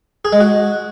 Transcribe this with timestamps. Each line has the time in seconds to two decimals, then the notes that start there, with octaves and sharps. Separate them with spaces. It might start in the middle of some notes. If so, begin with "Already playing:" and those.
0.25 G#4
0.33 G#3
0.40 F#4